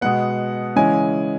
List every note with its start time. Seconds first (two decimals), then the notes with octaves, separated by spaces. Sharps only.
0.01 B2 G#3 B3 F#5
0.76 C#3 E3 G#3 C#4 G#5